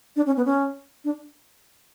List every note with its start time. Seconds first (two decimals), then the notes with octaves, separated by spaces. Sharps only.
0.16 D4
0.26 C#4
0.37 B3
0.45 C#4
1.05 D4